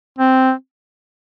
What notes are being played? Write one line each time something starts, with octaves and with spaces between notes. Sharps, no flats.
C4